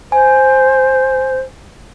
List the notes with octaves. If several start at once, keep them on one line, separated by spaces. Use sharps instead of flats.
C5 G#5